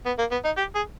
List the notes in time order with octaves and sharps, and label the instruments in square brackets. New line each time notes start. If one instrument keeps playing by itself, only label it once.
[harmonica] B3
A#3
B3
D#4
G4
G#4